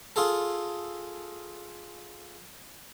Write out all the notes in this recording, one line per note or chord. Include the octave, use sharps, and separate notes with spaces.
F4 G#4 A4